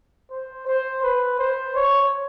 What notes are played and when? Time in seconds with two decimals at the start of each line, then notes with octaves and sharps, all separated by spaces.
0.30 C5
0.67 C5
1.03 B4
1.39 C5
1.75 C#5